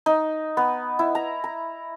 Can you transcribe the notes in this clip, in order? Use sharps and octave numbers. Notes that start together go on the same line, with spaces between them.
D#4
B3
E4
A#5
A#5